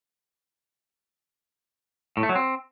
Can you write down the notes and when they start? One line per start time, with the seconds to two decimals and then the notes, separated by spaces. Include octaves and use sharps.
2.17 A2
2.23 A3
2.29 F#3
2.35 C4